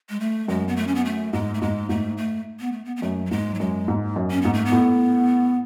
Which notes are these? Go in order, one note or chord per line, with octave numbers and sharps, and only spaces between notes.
G#3
A3
F#2 G#3
B3
A3
C#4
B3
A3
G#2 G#3
A3
G#2 G#3
G#2 A3
A3
B3
A3
B3
B3
F#2 A3
F#3
G#2 G#3
F#3
F#2 G#3
G#2
F#2
C#4
G#2 B3
A3
B3
A2